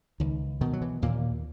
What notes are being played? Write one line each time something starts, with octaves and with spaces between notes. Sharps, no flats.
C#2 D#3
B2 D#3
F#3
E3
D#2 A#2 A#3